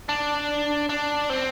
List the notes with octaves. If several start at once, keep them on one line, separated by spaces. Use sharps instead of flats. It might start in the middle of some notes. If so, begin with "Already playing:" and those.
D4
D4
C4